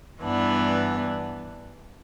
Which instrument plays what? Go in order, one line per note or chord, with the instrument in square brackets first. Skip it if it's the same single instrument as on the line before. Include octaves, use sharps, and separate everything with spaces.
[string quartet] G2 E3 B3 D4